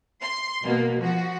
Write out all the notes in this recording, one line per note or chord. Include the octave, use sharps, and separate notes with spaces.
C6
B2 A#3
F3 F#4